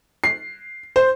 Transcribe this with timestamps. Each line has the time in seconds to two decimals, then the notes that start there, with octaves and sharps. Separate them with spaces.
0.24 C7
0.96 C5